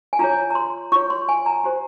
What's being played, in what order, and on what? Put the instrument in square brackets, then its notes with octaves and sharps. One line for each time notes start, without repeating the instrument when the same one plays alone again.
[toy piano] G#5
F4 G#4 C#5 A#5
A#5
C6
F4 G#4 C#5 C#6
C6
G#5
A#5
G4 C5